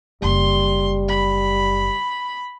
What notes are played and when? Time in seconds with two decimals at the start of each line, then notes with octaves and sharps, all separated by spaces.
0.22 F#1 G3 C6
1.08 B5